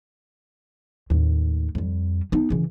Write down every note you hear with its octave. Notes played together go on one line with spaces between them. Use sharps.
D#2 A2
F2 G3
B3 D#4
C#3 E3